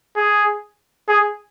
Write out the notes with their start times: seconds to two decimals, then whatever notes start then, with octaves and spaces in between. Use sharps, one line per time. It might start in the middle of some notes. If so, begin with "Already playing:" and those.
0.16 G#4
1.08 G#4